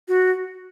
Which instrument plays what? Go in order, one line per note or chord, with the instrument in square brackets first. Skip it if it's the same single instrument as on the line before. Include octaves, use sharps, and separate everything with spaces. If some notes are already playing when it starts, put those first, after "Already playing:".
[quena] F#4